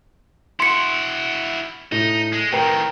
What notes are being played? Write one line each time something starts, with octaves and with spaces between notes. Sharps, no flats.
E4 F#4 C6 C#7
A2 D#4
G#3
A2 D#3 A#4 B4 G5